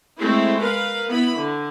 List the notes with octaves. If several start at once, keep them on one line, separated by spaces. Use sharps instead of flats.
G#3 A3 C4 E4
A#4 B4 F5
B3 E4 B5
D3